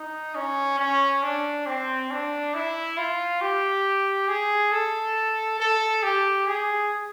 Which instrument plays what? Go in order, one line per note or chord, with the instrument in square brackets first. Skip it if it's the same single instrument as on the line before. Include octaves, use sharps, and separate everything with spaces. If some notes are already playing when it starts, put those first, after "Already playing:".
Already playing: [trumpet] D#4
C#4
C#4
D4
C4
D4
E4
F4
G4
G#4
A4
A4
G4
G#4